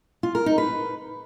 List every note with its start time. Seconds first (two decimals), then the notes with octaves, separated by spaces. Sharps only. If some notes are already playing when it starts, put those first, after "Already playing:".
0.23 F4
0.35 A#4
0.46 D#4
0.58 B4